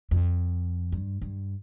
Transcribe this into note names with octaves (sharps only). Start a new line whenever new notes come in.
F2
G2
G2